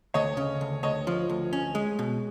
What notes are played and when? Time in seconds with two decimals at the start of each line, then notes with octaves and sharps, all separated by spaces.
0.14 D2 C#5 D#5
0.37 C#3
0.61 D2
0.83 D2 C#5 D#5
1.07 F3
1.29 D2
1.53 C#4
1.75 G#3
1.99 B2